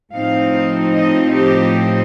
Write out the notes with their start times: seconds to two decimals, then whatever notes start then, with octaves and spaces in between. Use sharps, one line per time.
0.13 A2 F3 C4 D#4 F5
0.94 D#5
1.35 G4